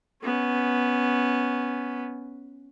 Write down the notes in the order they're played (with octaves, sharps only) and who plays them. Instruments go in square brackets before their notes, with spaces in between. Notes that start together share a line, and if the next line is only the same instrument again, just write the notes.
[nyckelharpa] B3 C#4